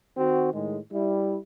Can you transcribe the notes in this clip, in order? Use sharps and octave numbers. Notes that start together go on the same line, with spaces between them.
D#3 C4 F#4
A2 D#3 G#3
G3 E4